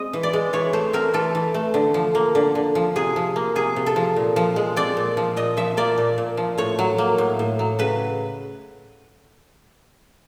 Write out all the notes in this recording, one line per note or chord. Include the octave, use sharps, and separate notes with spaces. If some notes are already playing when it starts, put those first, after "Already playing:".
Already playing: G#3 C4 D#5
E3
D5
G#3
E3 C#5
A3 C5
C4 A#4
E3 A4
E3
A3
D3
F3
A#3
D3
D3
F3
C3 G#4
F3
A#3
C3 G#4
C3
A4
F3
A#2
F3
G#3
C4 D5
A#2
F3
A#2 D#5
F3 E5
A#3 D5
A#2
A#2
F3
A2 C#5
F#3
A#3
A2
A2
F#3
C#3 B4